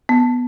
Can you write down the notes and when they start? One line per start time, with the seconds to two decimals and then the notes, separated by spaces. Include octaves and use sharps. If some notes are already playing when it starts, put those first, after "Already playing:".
0.09 B3